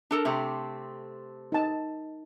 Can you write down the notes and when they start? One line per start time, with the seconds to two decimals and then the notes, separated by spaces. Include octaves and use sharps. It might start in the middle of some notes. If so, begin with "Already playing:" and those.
0.11 D4 A4 A#4
0.25 C3 A3 C4
1.52 D#4 A5